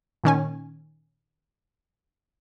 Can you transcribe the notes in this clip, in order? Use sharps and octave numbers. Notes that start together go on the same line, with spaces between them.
A#2 D#3 C#4 G#5